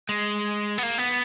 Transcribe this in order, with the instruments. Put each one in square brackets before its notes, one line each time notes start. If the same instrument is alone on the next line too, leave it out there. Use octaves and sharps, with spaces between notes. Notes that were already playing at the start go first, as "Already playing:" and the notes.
[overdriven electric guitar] G#3
B3
A#3
B3